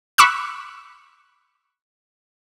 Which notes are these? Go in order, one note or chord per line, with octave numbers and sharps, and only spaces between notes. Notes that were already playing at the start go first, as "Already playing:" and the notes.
B5 C#6 D6 E6 F#6